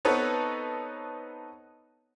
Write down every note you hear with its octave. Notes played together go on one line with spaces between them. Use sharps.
B3 C4 D#4 A4 B4 C#5